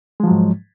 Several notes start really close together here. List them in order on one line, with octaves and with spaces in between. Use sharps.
G#3 F3 F#3 G#2